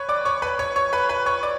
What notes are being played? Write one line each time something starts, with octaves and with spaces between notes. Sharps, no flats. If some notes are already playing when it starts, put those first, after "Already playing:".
Already playing: B4 C#5 B5 C#6
D5 D6
C#5 C#6
B4 B5
C#5 C#6
C#5 C#6
B4 B5
B4 B5
C#5 C#6
D5 D6